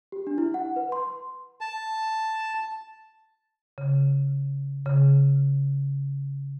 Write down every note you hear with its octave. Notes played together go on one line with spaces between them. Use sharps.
G4
D4
E4
F#5
B4
C6
A5
C#3
C#3